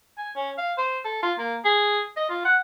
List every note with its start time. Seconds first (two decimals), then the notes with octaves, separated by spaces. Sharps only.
0.18 G#5
0.36 C#4
0.58 F5
0.78 C5
1.05 A4
1.23 F4
1.38 A#3
1.65 G#4
2.17 D#5
2.29 F4
2.45 F#5